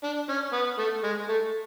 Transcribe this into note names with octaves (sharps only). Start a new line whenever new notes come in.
D4
C#4
B3
A3
G#3
A3